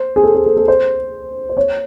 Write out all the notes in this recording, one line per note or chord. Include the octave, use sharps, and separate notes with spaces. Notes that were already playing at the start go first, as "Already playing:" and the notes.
Already playing: C5
G#4
A4
G#4
A4
A4
C5
C5
C#5